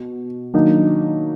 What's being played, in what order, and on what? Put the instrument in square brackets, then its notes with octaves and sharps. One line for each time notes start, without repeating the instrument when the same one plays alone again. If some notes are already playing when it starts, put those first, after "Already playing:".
Already playing: [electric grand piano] B2 F#4
[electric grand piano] D#3 F#3 A#3 D4 F#4 [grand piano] D#4